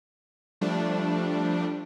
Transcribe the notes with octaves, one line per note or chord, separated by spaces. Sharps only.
F3 G3 A3 D4